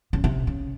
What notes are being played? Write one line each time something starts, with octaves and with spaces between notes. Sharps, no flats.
C#3
C3
C#3